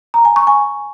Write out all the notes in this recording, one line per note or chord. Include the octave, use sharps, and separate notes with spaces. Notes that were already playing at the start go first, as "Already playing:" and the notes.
A#5
G#5
C#6
G#5